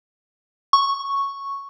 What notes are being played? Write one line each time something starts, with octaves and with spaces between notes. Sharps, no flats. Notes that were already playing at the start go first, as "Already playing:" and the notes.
C#6